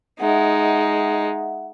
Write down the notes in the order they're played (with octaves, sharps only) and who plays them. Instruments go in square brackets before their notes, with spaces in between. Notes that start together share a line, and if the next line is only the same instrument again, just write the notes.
[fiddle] G#3 D#4 [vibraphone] E5 F#5